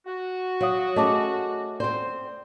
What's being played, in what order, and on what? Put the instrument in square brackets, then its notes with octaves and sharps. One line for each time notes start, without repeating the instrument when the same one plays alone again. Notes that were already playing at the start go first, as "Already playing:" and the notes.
[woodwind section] F#4
[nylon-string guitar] F#3 [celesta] C#5 F5 D#6
[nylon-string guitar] A3 C#4 G#4 [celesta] D#5 A5 D6
[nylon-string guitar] C4 C5 [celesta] D5